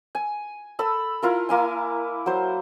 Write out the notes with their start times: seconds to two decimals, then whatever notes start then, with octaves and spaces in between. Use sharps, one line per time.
0.15 G#5
0.79 A4 B5 E6
1.22 E4 F4 A#4
1.49 A#3 E4 G#5
2.26 F#3 C5